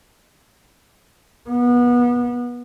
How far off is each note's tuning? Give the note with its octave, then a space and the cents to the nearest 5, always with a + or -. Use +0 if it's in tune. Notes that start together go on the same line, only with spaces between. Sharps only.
B3 -25